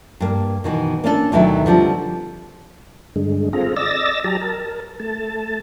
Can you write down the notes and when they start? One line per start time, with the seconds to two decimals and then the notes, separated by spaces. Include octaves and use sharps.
0.20 G2 A#3
0.64 B2 D#3 E3
1.04 A#3 C#4 D4 E4 A4
1.32 D2 B2 D#3 F#3 B3 E4
1.66 D3 F3 G3 C4
3.16 G2 D3 G#3
3.53 C4 F4 G#4 A4 A#5
3.76 D5 D#5 E6 A6 A#6
4.24 F#3 G4 A5 A#5
4.41 A#4 A5
5.00 A3 A5